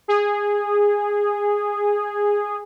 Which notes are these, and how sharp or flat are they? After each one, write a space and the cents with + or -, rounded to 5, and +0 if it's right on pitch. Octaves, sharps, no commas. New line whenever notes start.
G#4 -15